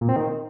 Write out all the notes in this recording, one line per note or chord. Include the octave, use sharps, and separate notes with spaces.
A#2
C4
D#3